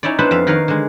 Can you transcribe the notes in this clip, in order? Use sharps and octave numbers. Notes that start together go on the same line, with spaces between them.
C#4 D#4 E4 C#5 D5
B3 D4 E4 B4 C5
F2 E5 F5
D#3 A#4 B4 C#5 F5
D3 G#3